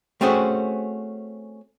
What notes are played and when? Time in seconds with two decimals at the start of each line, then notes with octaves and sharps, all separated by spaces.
0.21 A3 C4 C#4 F#4 G#4 C5